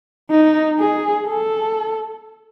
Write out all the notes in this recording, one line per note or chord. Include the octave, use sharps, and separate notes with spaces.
D#4
G#4
A4